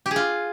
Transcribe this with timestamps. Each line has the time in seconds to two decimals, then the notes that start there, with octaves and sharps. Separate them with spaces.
0.06 G4
0.11 G#4
0.16 F4